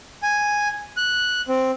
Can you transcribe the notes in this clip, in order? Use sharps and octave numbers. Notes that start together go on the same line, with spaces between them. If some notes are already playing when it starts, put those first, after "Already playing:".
G#5
F#6
C4